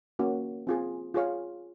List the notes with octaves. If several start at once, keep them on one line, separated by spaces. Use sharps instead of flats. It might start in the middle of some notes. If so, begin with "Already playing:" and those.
A#3 C#4 F#4
C4 F4 G#4
F4 G#4 C#5 F5